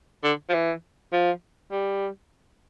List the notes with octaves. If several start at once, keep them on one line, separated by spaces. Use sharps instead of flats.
D3
F3
E3
F3
G3